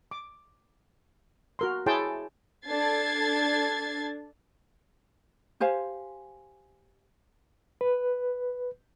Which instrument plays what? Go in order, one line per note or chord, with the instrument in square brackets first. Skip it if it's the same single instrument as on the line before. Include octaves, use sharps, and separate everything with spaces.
[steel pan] D6
F#4 A#4 C6
E4 G#4 C#5 G5 A5 C6
[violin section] D4 A4 G#6 A6 C7
[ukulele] G4 C5 F5 G#5
[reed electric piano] B4